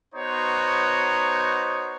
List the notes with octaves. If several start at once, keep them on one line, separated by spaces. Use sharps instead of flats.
B3 D#4 F#4 C5 C#5